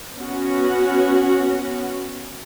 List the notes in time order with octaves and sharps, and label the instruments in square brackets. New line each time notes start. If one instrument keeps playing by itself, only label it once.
[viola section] B3 C#4 F#4